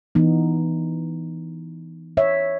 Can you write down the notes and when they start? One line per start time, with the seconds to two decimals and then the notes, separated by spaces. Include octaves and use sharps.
0.15 E3 B3 D#4
2.17 C#5 E5